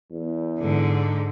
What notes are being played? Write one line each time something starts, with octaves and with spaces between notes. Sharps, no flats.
E2
G#2 D3